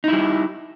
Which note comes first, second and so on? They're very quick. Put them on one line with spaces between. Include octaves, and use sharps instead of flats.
D#4 E4 G3